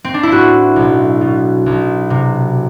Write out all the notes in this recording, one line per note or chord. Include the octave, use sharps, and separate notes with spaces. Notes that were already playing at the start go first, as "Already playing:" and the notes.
C4
D4
E4
A2 F#4
B1
B2
B1
C3